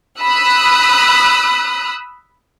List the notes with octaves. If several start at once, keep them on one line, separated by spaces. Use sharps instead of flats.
B5 D#6 E6 F#6